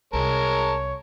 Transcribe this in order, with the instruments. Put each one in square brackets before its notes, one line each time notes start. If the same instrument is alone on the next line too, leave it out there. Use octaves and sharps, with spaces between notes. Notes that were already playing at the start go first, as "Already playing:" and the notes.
[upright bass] C2 [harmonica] G#3 A#4 A5 [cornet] C#5